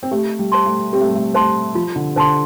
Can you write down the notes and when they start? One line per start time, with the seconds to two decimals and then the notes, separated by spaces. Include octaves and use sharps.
0.03 C4
0.11 A3 G4
0.39 G3
0.52 C5 A5 C6
0.66 A3
0.93 C4 G4
1.01 A3
1.08 G3
1.15 A3
1.34 A3 C5 A5 C6
1.75 F3 F4
1.96 D3
2.16 D3 C5 A5 C6